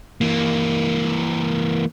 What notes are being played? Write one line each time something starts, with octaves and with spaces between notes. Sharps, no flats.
E3 A#3